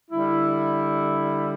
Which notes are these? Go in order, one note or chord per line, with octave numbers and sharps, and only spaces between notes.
D3 G3 E4